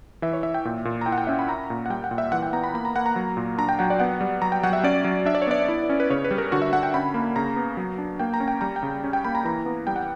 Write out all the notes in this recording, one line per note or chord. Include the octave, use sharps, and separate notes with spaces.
E3 E5
C#5
E3 E5
G5
A#2
A#2
A#5
E4 G5
F#5
G5
C#4 E5
B5
C#4 A#5
A#2
F#5
G3 G5
F#5
A#2
E5
E3 F#5
G5
B3 A#5
B5
A#3 B5
A#5
A#3 F#5
A#5
F#3
A#2
D4 A#5
G5
F#3 F#5
D5
B3 F#5
G3
F#3 A#5
G5
F#3 F#5
E5
C#4 D5
F#3
D4 E5
D5
C#5
B3 D5
E4
C#4
B4
C#3 C#5
B4
G3
A#4
D3 F#4
E5
D3 F#5
G5
C#4 B5
A#3
C#3 A#5
B3
F#3
D4
A#3 G5
A#5
C#4
G5
G3 A#5
G5
C#3
C#4
G5
A#3 B5
A#5
E3 A#5
B3
G3 G5
F#5